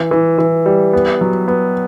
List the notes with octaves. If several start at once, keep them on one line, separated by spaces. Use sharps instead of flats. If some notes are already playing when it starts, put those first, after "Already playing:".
Already playing: E3
E3
E3
G3
B3
F#3
B3